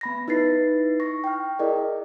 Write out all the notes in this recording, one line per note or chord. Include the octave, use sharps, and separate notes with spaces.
B3 B5 A#6
D#4 E4 B4 A6 C7
C#6 A#6
G5 F6
E4 G#4 A#4 D5 D#5